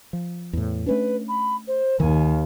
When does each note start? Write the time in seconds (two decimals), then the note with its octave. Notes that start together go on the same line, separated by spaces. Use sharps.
0.13 F3
0.53 E2 A2
0.86 A3 C#4 D4 B4
1.28 B5
1.67 C5
2.00 D#2 D#3 G#5